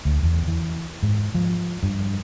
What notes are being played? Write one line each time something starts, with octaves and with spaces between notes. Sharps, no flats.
D2
E2
E3
G#2
F3
G2